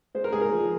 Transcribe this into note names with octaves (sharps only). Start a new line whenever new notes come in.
G#3 C5
A#4
G#2 G#4
A#4
F3